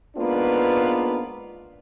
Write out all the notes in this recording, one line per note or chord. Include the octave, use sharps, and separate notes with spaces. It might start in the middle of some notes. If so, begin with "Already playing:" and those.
G#2 A#3 B3 D4 F4 B4